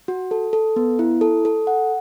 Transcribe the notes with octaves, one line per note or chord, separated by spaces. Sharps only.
F#4
A4
A4
B3
E4
A4
A4
F#5